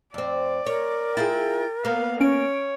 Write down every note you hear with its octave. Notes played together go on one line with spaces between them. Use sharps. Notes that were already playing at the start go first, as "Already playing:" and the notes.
F2 C4 D5
A#4 C#5
E4 F4 G#4 G5 A6
A#3 B3 F5
C#4 C#5 D7